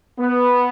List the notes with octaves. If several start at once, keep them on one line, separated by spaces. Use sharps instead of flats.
B3